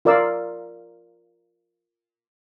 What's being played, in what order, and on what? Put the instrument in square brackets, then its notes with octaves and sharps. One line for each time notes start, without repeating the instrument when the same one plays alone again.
[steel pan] F4 A#4 D5 F5 E6